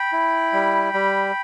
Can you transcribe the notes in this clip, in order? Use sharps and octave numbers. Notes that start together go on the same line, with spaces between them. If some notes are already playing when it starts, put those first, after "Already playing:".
Already playing: G5 B5
E4
G3
G3